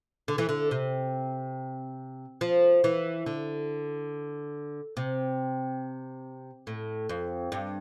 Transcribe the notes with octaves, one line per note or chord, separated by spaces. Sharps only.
D3
E3
D3
C3
F3
E3
D3
C3
A2
F2
G2